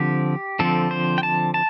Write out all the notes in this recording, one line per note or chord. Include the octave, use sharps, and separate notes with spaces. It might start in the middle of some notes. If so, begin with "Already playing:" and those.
Already playing: D3 F3 C4 G4
D3 F3 C4 A4
C5
G5
A5
A5